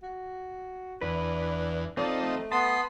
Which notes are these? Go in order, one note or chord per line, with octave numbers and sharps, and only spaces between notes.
F#4
E2 D4 B4
F3 C4 D#4 A4 D5 D#5
A3
B3 A5 B5 C6 D#6